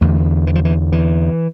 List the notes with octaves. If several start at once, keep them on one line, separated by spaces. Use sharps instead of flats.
E2 D3 A3
E3
F3
E3
E3